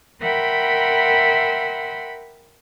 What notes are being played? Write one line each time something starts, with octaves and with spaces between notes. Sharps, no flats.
A#4 E5 F#5 G5 B5 C6